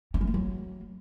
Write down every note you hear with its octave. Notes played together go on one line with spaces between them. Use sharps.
C#4
G3
G#3
F#3